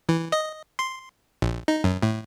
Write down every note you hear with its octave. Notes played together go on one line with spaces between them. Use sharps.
E3
D#5
C6
A#1
D#4
F#2
A2